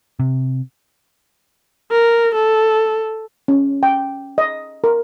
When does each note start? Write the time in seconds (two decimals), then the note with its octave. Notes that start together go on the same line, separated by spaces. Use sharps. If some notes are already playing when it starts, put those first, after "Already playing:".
0.19 C3
1.91 A#4
2.35 A4
3.48 C#4
3.83 G5
4.38 D#5
4.84 A#4